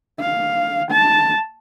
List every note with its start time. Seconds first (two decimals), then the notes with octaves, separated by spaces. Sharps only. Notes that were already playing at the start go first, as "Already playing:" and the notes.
0.20 F5
0.91 A5